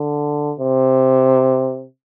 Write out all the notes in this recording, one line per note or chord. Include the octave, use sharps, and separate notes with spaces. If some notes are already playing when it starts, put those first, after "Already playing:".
Already playing: D3
C3